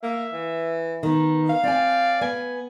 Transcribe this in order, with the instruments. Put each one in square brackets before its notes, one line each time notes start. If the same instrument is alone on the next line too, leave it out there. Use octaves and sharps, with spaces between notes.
[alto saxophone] A#3 [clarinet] E5
[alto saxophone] E3
[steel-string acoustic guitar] D#3 B3 [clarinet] D#4
[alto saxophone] F5
[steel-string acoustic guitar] C4 G#5 [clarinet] D5
[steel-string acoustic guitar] B3 [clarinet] G#5